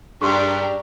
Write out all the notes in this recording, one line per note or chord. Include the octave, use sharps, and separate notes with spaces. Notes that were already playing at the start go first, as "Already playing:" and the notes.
G2 D4 G4 G#4 A#4 C6 C#6